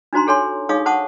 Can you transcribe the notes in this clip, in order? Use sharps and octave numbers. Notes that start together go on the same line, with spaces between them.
D4 D#4 F#4 C5 A#5 C6
G4 A4 C#5 G#5 C6
D#4 G#4 C#5 F5 C#6 D#6
C5 F#5 A5 C#6 D#6